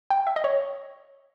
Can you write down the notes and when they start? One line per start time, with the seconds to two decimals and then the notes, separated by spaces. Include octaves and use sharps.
0.10 G5
0.27 E5
0.36 D#5
0.44 C#5